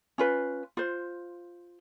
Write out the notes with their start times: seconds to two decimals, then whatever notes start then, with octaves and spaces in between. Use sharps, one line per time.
0.18 C#4 F4 B4
0.77 F4 C5